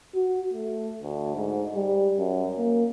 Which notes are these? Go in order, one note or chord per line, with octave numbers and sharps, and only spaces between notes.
F#4
A3
D2
G#2
G3
F#2
A#3